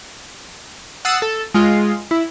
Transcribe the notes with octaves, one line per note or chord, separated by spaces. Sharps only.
F#5 D#6 E6 A6 C7
A4
G#3 F4
E4